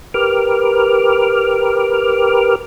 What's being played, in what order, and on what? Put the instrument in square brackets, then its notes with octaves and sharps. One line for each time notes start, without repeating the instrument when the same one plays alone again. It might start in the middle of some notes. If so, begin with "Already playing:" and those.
[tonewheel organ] G4 A#4 B4 D6 F6